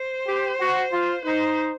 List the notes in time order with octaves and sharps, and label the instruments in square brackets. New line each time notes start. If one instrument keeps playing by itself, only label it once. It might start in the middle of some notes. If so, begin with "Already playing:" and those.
Already playing: [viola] C5
[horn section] G4
F#4
F4
[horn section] D#4 [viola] C5